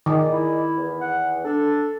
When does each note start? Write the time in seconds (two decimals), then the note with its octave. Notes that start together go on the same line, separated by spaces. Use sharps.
0.06 D#3 G#4 D5 D#5
0.30 E4
0.76 E2
1.01 F#5
1.45 D4 A4